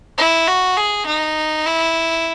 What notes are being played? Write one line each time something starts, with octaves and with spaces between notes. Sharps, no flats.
E4
F#4
G#4
D#4
E4